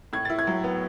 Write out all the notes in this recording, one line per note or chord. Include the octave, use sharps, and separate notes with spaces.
A2 G#6
E4 A6
G#6
F#3
B3